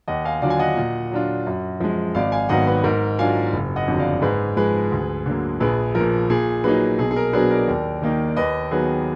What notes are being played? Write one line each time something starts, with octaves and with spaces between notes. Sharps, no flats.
D#2 D#5 F#5
F5 G#5
D3 F#3 D4 F4 D5 F5
G#5
D#5 F#5
A#2
F#3 D4 F4
F#2
F3 G#3
G#1 D5 F5
F5 G#5
G#2 D#3 F#3 B3 D#5 F#5
B4 D#5
G#2 A#4
F#3 D4 F4 F5 G#5
F#1
D#5 F#5
F2 D3 F#3
D5 F5
G#2 G#4 B4
F3 G#3 G#4 B4
D2
D3 F#3 A#3
A#1 G#4 B4
F3 A#4
A#2
A#2 G#4
F#3 A#3 D#4 G#4 B4
B1 G#4
G#4
A#4
B2 F#3 D4 G#4 B4
A#4 D5
D#2
D#3 A#3 D#4
D5
D#2 B4 D#5
D#3 F#3 B3 G#4 B4